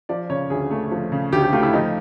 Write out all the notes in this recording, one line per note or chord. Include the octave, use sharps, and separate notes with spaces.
F3 D5
C#3 C#5
D2 G#4
A3
F3
C#3
D2 G4
G4
A3 F4
E4
F3 D#4